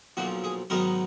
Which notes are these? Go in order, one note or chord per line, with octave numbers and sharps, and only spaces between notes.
B1 A#2 F3 F#4
G#4
G#2 D#3 F#3 B3 D#4 A#4